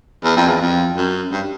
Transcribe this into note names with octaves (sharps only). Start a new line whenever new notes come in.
E2
F2
E2
F2
F#2
G2